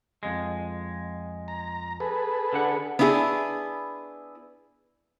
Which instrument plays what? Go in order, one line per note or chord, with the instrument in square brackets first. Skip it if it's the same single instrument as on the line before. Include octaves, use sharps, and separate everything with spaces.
[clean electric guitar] F2 G#3
[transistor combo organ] A#5
G#4 A4 B4
[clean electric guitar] D3 D4 F#5
[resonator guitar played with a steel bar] B3 D4 E4 F4 G#4